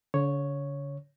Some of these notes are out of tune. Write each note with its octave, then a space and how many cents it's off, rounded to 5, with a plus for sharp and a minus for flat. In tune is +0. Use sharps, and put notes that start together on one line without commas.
D3 -45 C#5 +0